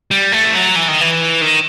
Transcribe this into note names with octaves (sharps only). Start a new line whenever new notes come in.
G3
A3
E3
F#3
E3
D#3
E3
D#3